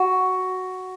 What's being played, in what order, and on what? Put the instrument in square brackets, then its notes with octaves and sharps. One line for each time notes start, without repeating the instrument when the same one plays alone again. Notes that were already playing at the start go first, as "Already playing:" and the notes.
Already playing: [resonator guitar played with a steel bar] F#4